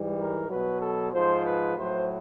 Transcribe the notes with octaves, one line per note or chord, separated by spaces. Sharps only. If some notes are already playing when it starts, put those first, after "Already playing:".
Already playing: G#2 E3 G3
A#4
B2 F#3 B4
A4
G#2 F3 C5
B4
A2 F#3 C5